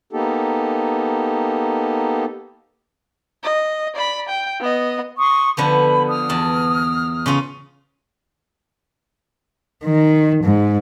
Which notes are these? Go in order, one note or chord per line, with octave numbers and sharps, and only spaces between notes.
A#3 B3 D#4 G4 A4
D#5
D5 B5
G5
B3 D#5
C6 C#6 D#6
D3 F3 B3 B5
D#6 F6
E2 A5
C#3 C#4 F4
D#3
G#2